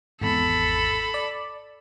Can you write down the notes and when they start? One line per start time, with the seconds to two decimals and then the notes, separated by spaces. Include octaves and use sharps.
0.21 G#1 E2 A4 B5
1.14 D5